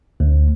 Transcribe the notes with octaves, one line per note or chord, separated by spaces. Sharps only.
D2